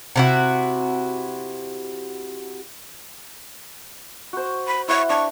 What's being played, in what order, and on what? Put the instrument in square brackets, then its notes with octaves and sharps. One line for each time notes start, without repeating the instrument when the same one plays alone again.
[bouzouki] C3 E4 F#4
[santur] F#4 C5
[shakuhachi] B5
[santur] E4 F#5 [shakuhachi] C#6
[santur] D4 [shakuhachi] C#6